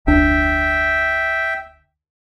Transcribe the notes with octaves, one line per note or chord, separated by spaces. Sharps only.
F1 D2 D4 E5 G5